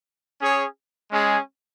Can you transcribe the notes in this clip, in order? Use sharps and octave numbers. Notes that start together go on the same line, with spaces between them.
C#4 G#4 C#5
G#3 C#4 G#4